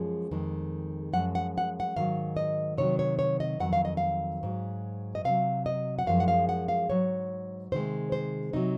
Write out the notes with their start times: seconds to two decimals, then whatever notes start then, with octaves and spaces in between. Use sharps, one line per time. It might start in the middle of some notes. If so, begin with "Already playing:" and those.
Already playing: F#2 F3 G#3 G#4
0.31 F2 D#3 G#3
1.13 F#2 F3 G#3 F#5
1.35 F#5
1.58 F#5
1.80 F#5
1.96 G#2 D#3 F#3 F5
2.37 D#5
2.77 C3 D#3 F#3 C#5
2.99 C#5
3.19 C#5
3.40 D#5
3.60 F2 D#3 F#3 F#5
3.73 F5
3.85 D#5
3.97 F5
4.43 G#2 F#3
5.15 D#5
5.25 C3 F#3 F5
5.66 D#5
5.99 F#5
6.06 F#2 F3 G#3 F5
6.20 F#5
6.28 F5
6.49 F#5
6.68 F5
6.89 G#2 F#3 C#5
7.72 C3 D#3 G#3 C5
8.12 C5
8.53 C3 F#3 D#4